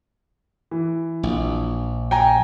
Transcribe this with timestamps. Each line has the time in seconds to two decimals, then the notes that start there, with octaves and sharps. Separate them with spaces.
0.71 E3
1.23 A#1
2.11 G5 G#5 A#5